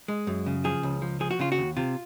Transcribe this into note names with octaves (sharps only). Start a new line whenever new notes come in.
G#3
F#2
C#3
F3 G#4
C#2
F3
F3 G#4
F#4
C#3 F4
F#4
D#2
C3 F4